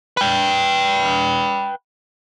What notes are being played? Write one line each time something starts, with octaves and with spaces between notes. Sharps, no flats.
B4 G5